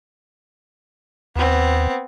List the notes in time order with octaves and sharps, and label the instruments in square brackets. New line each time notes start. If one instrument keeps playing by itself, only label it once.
[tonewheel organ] D#2 [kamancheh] B3 C4